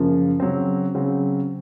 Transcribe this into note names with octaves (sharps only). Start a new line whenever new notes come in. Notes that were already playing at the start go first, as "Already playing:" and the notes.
Already playing: F#2 C#3 F3 A#3
C#3 F#3 C4
C#3 F#3 C4